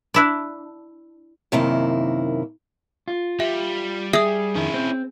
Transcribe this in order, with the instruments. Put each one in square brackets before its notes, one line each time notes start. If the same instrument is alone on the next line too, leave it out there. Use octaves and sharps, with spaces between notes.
[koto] D4 E4 D5
[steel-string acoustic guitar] F#2 C3 D#3 A#3 E4
[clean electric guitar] F4
[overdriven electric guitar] G3 [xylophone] E5
[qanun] G#4 [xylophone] E5 D#6
[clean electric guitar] F2 D#3 [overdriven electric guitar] C#4 E4
[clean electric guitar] C4